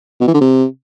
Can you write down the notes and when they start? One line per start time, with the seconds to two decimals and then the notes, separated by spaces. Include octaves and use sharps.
0.21 B2
0.27 E3
0.34 D3
0.41 C3